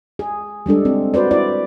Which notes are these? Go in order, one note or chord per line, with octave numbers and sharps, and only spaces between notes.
G#4
G3 G#3 D4 A4
C4
F#4 B4 C5 D5
E4 D5